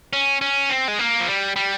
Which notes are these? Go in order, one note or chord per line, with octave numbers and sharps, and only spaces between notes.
C#4
C#4
C4
G#3
A#3
F3
G3
G3